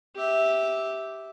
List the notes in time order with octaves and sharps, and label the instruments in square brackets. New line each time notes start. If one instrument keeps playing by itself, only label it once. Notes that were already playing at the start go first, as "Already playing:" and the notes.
[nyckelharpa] G4 E5